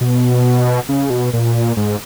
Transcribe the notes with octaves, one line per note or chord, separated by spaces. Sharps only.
B2
C#3
B2
A#2
G#2